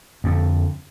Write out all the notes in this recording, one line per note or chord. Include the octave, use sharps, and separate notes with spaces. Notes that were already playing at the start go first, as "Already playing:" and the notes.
F2 D3